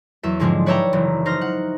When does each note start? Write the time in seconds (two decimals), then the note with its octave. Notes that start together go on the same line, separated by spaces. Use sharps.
0.23 E2 F#3 E5
0.40 G#2 D3 F3 G#3 C4 D4
0.66 B4 C#5 D5 E5 G5 A#5
0.93 F#1 E3
1.26 D#4 C5 F6 A#6
1.41 F#5